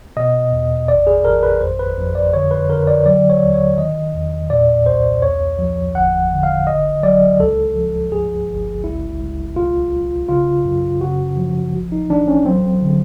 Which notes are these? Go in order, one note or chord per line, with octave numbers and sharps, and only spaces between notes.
B2 D#5
E2
G#1 D5
G#4
G#1 A#4
B4
F2 C5
B4
F2
D5
D3 C#5
B4
D3 A#4
D5
F#3 D5
C#5
D#2
C#5
D#3 D#5
E2
A#2 D5
C2 C5
E2 C#5
F3
G1 F#5
D3
F5
G#1 D#5
F#3 D5
C#2 A4
F3
G2 G#4
G1
C#2 E4
C#2
B1 F4
B1
C#3 F4
F#2
C#3 F#4
F3
A1
D#4
E3 D4
C#4
F#3 C4
D3